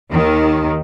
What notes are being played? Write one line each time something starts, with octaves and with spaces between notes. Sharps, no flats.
D#2 D#3